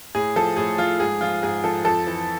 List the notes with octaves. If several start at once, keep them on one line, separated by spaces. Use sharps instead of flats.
A2 G#4
F3 A4
A2 G#4
F3 F4
G#2 G#4
F3 F4
G#2 G#4
F3 A4
F2 A4
E3